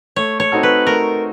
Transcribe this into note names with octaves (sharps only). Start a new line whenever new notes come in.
A3 C#5
C#5
C4 D#4 F#4 A4
B4
A3 A#4